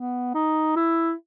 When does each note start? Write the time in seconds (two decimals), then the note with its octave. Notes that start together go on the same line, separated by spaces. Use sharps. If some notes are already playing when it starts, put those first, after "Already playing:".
Already playing: B3
0.34 D#4
0.76 E4